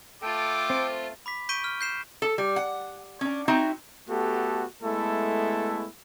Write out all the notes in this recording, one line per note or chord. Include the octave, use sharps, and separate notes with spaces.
A3 F4 A4 G5 D6
C4
B5 D6 B6
C#6 G6 B6 D7 D#7 G7
F6
G6 C7 E7
A4
G3
F#5
C#4 D4
C4 D#4 E4 F#4
A3 B3 F#4 G4 A4
G#3 A3 B3 E4 A4